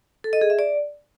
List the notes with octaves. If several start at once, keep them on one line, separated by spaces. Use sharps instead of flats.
A4
D#5
G#4
E5
D5